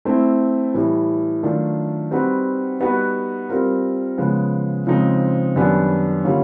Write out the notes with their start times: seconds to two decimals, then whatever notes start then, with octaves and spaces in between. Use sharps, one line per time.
0.05 A3 C4 E4
0.74 A2 E3 G3
1.43 D#3 F#3 A3 D4 F4
2.11 G3 C4 D#4 F#4 B4
2.80 G3 B3 D#4 F#4 B4
3.49 G3 C4 F4 A#4
4.18 C#3 F3 G#3 B3
4.86 C#3 F3 G#3 C4 D#4
5.56 F#2 D#3 G3 B3 D4
6.24 D3 G3 A#3 C#4 F4